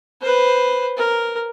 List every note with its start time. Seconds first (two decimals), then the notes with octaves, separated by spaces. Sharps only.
0.21 B4 C5
0.97 A#4